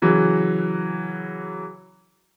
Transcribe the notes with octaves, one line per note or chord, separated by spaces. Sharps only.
C#3 E3 F#3